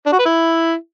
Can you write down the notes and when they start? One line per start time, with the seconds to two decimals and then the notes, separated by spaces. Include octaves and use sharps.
0.06 D4
0.13 F#4
0.19 B4
0.26 E4